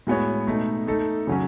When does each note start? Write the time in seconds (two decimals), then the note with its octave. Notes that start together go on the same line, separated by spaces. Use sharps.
0.07 A2 G#3 B3 F#4 C#5
0.47 B2 A3 D#4
0.87 A3 D#4 A4
1.27 C#3 F#3 C#4